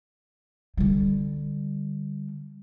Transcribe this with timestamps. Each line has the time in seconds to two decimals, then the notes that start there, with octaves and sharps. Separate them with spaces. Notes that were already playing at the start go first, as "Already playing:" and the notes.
0.77 D3 G3